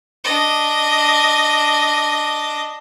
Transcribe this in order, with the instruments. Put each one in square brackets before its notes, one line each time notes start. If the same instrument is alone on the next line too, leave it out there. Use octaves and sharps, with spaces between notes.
[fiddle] D4 D#5